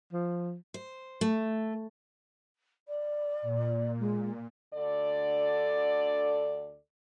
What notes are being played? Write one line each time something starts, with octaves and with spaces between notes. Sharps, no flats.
F3
C5
A3
D5
A#2
G#3
D2 D3 A4 D5